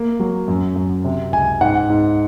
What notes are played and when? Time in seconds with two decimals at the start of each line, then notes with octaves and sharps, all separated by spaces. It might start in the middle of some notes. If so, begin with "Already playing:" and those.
Already playing: A#3
0.20 F#3
0.48 F#2
0.76 F#2
1.05 C3
1.32 C#2 G#5
1.61 G#2 F#5
1.90 G#2